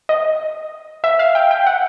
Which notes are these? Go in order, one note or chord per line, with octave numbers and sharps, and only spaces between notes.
D#5
E5
F5
G5
G5
F#5